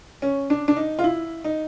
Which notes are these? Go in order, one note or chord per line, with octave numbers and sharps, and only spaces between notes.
C#4
D4
D4
D#4
F4
E4
D#4